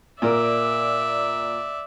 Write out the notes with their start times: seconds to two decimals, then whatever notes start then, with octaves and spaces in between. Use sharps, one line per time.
0.22 A#2 A#4 D5 E5